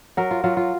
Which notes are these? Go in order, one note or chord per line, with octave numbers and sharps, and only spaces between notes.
F#3 A#4
F4
F#3 F4
F4